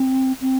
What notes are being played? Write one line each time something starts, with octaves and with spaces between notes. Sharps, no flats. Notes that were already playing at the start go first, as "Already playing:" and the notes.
Already playing: C4
C4